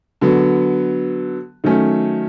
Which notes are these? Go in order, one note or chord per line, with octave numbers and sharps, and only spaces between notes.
D3 F#3 B3
D#3 F#3 A3 C#4